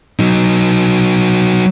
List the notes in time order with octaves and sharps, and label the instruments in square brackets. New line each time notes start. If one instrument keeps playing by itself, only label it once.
[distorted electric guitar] F#3 D#4